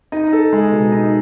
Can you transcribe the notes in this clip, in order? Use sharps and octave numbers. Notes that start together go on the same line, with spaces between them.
D#4
A4
G#3
B2
D#4